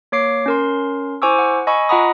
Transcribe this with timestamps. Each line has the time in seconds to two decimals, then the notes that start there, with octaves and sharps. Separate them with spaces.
0.12 A#3 C#5 D6 C7 D7
0.46 C#4 A#4 C6
1.22 E4 C5 G#5 C#6 D6 E6
1.39 F#5
1.67 D#5 G#5 B5 C#6 E6
1.89 F4 D#5 F#5 A#5 B5 D#6